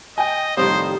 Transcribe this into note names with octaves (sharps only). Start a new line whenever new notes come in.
D#5 G5 G#5
F2 A2 D#3 G3 C5 D#6